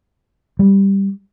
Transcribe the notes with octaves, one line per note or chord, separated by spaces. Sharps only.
G3